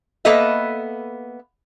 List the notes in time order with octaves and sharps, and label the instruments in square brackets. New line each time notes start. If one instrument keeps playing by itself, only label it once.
[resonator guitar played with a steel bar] A#3 B3 A4 B4 D#5 E5